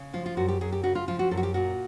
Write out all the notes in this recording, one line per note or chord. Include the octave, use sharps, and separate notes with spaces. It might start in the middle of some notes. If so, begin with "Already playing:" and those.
Already playing: C#3
F3 F4
F4
F#2 F#4
G4
F#2 G#4
G4
C#3 F#4
F4
F3 F4
F#4
F#2 A4
F#4
G4
A#2 F#4